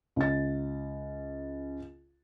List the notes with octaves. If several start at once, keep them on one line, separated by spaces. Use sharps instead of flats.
C#2 A6